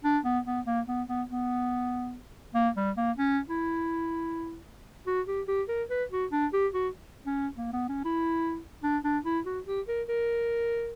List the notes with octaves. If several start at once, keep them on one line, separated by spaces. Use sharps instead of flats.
D4
B3
B3
A#3
B3
B3
B3
A#3
G3
A#3
C#4
E4
F#4
G4
G4
A#4
B4
F#4
D4
G4
F#4
C#4
A#3
B3
C#4
E4
D4
D4
E4
F#4
G4
A#4
A#4